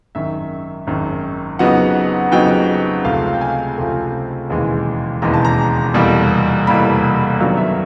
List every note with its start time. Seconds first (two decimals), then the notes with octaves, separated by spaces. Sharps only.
0.15 G#1 F#2 D#3 E5
0.87 G#1 F#2 D#3
1.59 F2 C#3 F#3 B3 D#4 F#5
2.32 F2 C#3 F#3 B3 D#4 G5
3.04 C#2 C3 F3 A3 F5
3.34 G5
3.41 G#5
3.77 C#2 C3 F3 A3
4.50 E1 D#2 C#3 E3 G#3
5.22 E1 D#2 C#3 E3 G#3 A#5
5.34 A5
5.45 A#5
5.94 F1 E2 B2 G3 A#3
6.67 F1 E2 B2 G3 A#3 B5
7.39 F#2 D#3 F#3 B3 D4 F5
7.57 E5